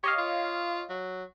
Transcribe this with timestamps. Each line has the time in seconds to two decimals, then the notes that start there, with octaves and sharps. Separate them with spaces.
0.04 G4 C#5 D#5 F5
0.18 F4
0.90 F#3